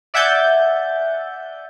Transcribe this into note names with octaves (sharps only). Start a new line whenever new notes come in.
D5 E5 F#5 G#5 G6 A6